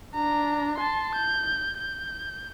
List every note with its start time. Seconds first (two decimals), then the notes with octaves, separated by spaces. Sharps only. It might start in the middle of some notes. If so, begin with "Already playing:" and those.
0.15 D4 A#5
0.78 A5 C6
1.15 G6
1.78 G6